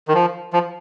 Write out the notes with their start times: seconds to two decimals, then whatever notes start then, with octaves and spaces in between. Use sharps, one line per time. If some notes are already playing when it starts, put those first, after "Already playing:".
0.08 D#3
0.14 F3
0.53 F3